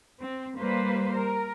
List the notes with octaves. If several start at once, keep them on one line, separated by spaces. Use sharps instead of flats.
C4
G3 A#3 B4 C5
A#4